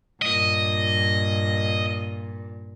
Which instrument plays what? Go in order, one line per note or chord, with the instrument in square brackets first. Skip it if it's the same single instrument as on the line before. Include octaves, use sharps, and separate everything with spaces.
[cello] G2 A#2 [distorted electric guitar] D#5